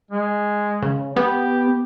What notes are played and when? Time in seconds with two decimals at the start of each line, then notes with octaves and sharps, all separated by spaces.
0.11 G#3
0.83 C#3
1.16 B3 G4